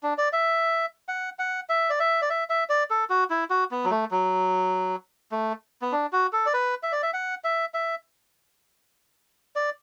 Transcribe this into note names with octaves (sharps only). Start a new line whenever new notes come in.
D4
D5
E5
F#5
F#5
E5
D5
E5
D5
E5
E5
D5
A4
F#4
E4
F#4
B3
F#3
A3
F#3
A3
B3
D4
F#4
A4
D5
B4
E5
D5
E5
F#5
E5
E5
D5